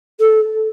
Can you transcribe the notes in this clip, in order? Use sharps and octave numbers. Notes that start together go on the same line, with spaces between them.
A4